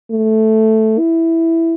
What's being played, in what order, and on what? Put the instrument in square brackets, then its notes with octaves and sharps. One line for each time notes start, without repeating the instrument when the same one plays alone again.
[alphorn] A3
E4